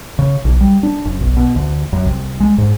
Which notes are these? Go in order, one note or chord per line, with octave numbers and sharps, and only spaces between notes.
C#3
B1
G3
D4
F#1
B1
B2
D2
F#2
C2
G#3
G#2